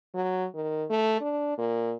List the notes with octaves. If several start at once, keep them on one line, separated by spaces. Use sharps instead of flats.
F#3
D#3
A3
D4
A#2